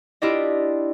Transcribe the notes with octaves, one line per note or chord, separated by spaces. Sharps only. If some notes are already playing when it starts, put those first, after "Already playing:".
D4 E4 F4 G4 D5 D#5